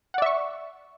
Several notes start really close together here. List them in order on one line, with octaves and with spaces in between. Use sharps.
F#5 D5 E5 C#6